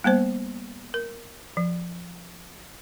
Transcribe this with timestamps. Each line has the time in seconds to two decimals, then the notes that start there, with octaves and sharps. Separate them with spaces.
0.04 G3 A#3 B3 C5
0.94 A#4
1.57 F3